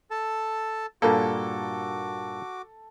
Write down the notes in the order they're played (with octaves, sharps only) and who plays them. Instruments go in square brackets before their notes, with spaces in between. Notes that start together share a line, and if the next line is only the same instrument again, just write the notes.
[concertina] A4 A5
[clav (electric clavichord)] G2 A#2 A#3 [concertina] F#4 D6 [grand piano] A4